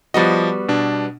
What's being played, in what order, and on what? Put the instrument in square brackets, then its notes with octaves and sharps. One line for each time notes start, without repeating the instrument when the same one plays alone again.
[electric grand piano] F3 D#5 [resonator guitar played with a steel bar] G3 B3 F#4
[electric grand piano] B2 D4